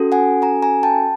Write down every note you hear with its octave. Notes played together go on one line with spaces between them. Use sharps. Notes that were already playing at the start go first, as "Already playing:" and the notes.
Already playing: C#4 F#4 A4
F#5 G#5
G#5 A#5
G#5 A#5
G5 A5